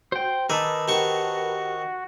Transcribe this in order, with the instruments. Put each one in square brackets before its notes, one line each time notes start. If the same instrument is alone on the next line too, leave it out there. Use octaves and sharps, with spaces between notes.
[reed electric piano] F#4 [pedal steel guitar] C5 G5
[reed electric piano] D#3 D6 E6 [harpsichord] D#4 G#4 [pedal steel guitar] A#4 B4 A5
[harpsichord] D#3 C4 C#6 [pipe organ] F#4 [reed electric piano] G4